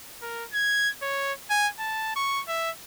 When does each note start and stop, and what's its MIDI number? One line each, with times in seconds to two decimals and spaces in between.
0.22 0.44 70
0.54 0.89 92
1.02 1.33 73
1.50 1.68 80
1.79 2.14 81
2.16 2.41 85
2.48 2.70 76